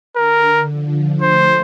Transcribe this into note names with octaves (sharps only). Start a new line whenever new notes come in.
D3 A#4
F3
A3 C5